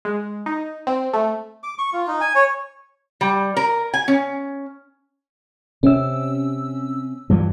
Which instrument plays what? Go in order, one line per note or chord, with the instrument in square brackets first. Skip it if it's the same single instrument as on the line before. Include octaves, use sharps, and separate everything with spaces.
[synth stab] G#3
D#4
C4
A3
[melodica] D6
C#6
F4
D#4
G#5
C#5
[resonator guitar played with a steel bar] G3
A#4
G#5
C#4
[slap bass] C3 [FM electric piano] C#4 E6
[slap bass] G2 E3 F3